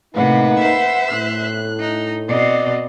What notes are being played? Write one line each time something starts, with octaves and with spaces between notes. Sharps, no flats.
A2 C3 A#3 D#4 B4 F#5
C5 E5
A2 F#6
D#4
B2 C4 D5 D#5